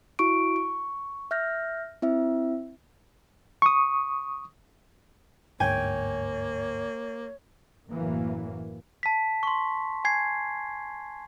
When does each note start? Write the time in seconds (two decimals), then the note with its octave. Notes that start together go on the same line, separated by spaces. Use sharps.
0.19 E4 F#4 C#6 D7
0.56 C#6
1.31 E5 F6 G6 A#6
2.02 C4 E4 E5
3.62 C#6 D#6
5.60 G1 D2 G#2 A#3 C#5 G5 G#5
7.89 F#1 F#2 A2 E3 F#3 A#3
9.03 A5 B6
9.43 C6 C#6
10.05 G#5 G#6 C7